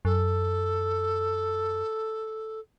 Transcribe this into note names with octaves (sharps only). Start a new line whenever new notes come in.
F#2 A4